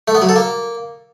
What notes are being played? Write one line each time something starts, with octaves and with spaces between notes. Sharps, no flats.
A3
B3
F#3
A4
A#3